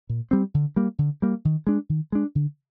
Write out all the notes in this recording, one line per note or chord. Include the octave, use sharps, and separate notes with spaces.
A#2
G3 C4
D3
G3 A#3
D3
G3 A#3
D#3
G#3 D4
D#3
G#3 D4
D3